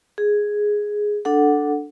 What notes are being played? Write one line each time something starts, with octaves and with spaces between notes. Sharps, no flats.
G#4
D4 A4 F#5